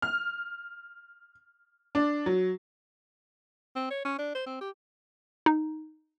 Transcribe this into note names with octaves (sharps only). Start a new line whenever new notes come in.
F6
D4
F#3
C4
C#5
C#4
D4
C5
C4
G4
D#4